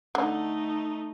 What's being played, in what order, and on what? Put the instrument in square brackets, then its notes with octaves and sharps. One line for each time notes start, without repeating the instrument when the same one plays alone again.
[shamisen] D3 [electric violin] A3 D#4